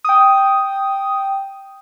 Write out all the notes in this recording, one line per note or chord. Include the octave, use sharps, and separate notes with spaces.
G5 D#6